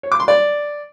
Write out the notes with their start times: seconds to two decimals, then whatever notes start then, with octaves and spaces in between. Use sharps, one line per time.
0.03 C#5
0.12 D6
0.20 C6
0.28 D5